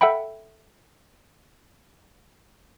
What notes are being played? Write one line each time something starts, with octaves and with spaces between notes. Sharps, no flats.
A4 E5 F#5 G5 B5